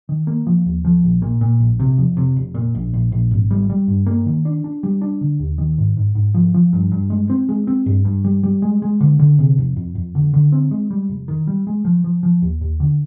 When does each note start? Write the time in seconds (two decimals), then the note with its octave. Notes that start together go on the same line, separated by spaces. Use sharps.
0.09 D#3
0.27 A#3
0.47 F3
0.66 D#2
0.85 F3
1.04 A#1
1.22 A#2
1.41 A#2
1.60 A#1
1.80 C3
1.98 F2
2.17 C3
2.36 F1
2.54 A#2
2.75 A#1
2.93 A#1
3.12 A#1
3.31 G#1
3.50 G3
3.70 G3
3.88 G2
4.06 A#3
4.26 D#3
4.45 D4
4.64 D4
4.83 G3
5.02 D4
5.21 D3
5.40 D#2
5.58 D#3
5.78 G#2
5.97 G#2
6.15 G#2
6.34 F3
6.54 F3
6.73 G2
6.92 G2
7.10 G#3
7.30 C4
7.49 G#3
7.67 C4
7.86 G2
8.05 G2
8.24 G3
8.43 G3
8.62 G#3
8.82 G#3
9.00 D3
9.19 D3
9.39 C3
9.58 F2
9.76 F2
9.95 F2
10.15 D3
10.34 D3
10.52 C4
10.71 G#3
10.91 G3
11.09 F1
11.28 D#3
11.47 G3
11.67 G#3
11.85 F3
12.04 F3
12.23 F3
12.42 D#2
12.61 D#2
12.80 D3